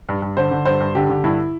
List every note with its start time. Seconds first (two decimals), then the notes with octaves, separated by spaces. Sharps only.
0.09 G2
0.22 G2
0.37 D3 C5
0.51 D3
0.65 G2 C5
0.80 G2
0.95 D3 G4
1.10 D3
1.24 G2 E4